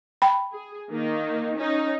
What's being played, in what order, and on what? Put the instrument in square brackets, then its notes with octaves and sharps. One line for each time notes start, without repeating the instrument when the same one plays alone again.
[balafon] G5 B5
[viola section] G#4
D#3 A#3 D#4
C#4 D#4